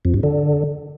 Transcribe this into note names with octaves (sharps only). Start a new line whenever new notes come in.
F2
G2
D3